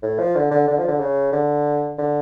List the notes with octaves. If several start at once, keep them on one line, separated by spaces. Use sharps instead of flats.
A2
F3
D3
D3
D3
F3
D3
C#3
D3
D3